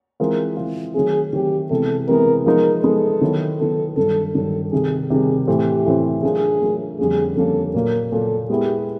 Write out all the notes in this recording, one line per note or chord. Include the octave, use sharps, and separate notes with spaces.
E3 G#3 C4 F4 A#4
E3 G#3 C4 F4
D#3 F#3 A3 C4 G#4
D#3 F#3 A3 C4 G4
C3 E3 G#3 B3 A4
C3 E3 G#3 B3 A#4
F3 G#3 B3 D#4 A#4
F3 G#3 B3 D#4 A4
D#3 F#3 B3 E4
D#3 F#3 B3 E4 A4
G2 D#3 F#3 A4
G2 D#3 F#3 A4
C3 D#3 G3 G#4
C3 D#3 G3 G#4
A2 E3 A3 C4 G4
A2 E3 A3 C4
F#3 A3 D4 F4 G#4 A#4
F#3 A3 D4 F4 A#4
F2 D3 G3 A#3 C#4 G#4
F2 D3 G3 A#3 C#4 A4
A#2 F#3 A#3 A#4
A#2 F#3 A#3 A4
G#3 B3 E4 G4 G#4